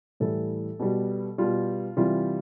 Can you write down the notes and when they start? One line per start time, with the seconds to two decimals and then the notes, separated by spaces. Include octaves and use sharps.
0.20 A2 E3 G3 A4
0.80 B2 G3
1.38 B2 G3 F4
1.97 C3 E3 G3 F4